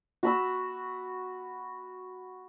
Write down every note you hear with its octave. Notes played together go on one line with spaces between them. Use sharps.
F#4 B5 E6